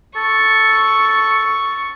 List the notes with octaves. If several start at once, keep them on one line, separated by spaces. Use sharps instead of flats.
A4 C#6